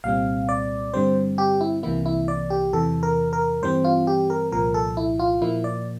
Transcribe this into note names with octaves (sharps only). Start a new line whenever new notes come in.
C2 A#2 G3 C4 F5
D5
G2 D3 G3 C4 C5
G4
E4
C2 C3 E3 A#3 E4
E4
D5
G4
E2 C3 E3 A4
A#4
A#4
G2 E3 G3 C4 C5
F4
G4
A#4
C2 A#2 F3 A#4
A4
E4
F4
A#2 F3 A#3 E4
D5